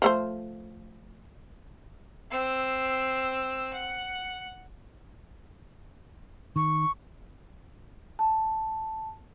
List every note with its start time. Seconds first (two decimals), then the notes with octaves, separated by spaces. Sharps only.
0.02 F3 A3 C5
2.31 C4 E6
3.74 F#5
6.56 D#3 C#6
8.19 A5